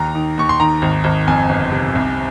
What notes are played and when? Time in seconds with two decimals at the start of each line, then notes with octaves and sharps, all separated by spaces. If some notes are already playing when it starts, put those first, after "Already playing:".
Already playing: D#2 A#5
0.15 D#3
0.37 D#2 C#6
0.49 C6
0.60 D#3 A#5
0.82 G#1
1.04 G#1
1.28 F2 G#5
1.49 G1
1.72 C3
1.95 C2